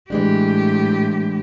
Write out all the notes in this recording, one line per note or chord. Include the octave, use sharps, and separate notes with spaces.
A2 E3 G#3 D4 G4